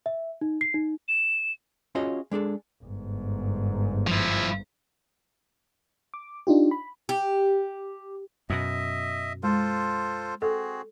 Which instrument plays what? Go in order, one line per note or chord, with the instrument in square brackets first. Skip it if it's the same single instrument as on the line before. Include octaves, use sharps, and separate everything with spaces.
[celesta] E5
D#4
C7
D#4
[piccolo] E7
[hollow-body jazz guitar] C#4 F4 F#4 G#4 C#5 D#5
G#3 D4 G#4 A4
[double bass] G1 G#2
[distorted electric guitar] F3 E4
[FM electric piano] D6
D4 D#4 F4 G4
B5
[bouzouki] G4
[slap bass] F#2 B2 [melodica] D#5 E5
[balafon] G#3 [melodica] F4 A4 C5
[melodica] C4 F#4 G#4 [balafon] A4